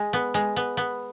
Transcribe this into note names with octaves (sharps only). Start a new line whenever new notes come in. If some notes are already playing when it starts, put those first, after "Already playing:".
Already playing: G#3
B3
G#3
B3
B3